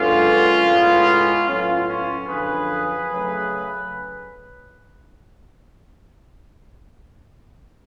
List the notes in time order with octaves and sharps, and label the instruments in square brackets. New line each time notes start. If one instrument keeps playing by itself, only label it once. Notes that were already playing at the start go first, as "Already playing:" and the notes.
Already playing: [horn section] F#2 D3 G#3 B3 C#4 F4
A2 G#3 B3
A2 F#3 B3 C#4 F4
C#4 F4
F#2 D3 F3 G#4 B4
C#3 F#3 A3